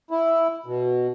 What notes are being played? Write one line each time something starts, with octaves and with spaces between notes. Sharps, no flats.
E4
B2